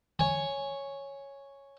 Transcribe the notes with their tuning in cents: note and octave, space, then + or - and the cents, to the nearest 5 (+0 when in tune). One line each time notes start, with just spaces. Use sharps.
C#5 +0 G#5 +0